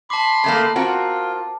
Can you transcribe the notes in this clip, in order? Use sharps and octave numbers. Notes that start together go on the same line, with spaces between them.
A5 B5 C6 D6
C#3 A3 A#3
C4 F4 F#4 A#4